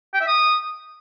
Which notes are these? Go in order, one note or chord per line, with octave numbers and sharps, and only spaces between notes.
G5
E5
D#6